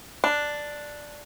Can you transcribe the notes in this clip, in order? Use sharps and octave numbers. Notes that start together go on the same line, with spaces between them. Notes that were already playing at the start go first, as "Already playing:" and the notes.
D4